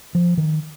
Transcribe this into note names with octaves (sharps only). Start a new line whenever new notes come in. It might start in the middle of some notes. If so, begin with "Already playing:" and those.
F3
D#3